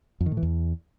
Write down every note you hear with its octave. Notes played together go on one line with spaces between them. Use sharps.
F2
D#3
A2
E3
E2